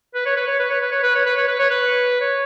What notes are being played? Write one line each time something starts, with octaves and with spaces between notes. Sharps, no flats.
B4
C#5
B4
C#5
B4
C#5
B4
C#5
B4
C#5
B4
C#5
B4
C#5
B4
C#5